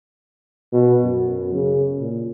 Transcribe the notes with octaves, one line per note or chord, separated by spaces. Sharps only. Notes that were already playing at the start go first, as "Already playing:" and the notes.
B2
F#2
C#3
A#2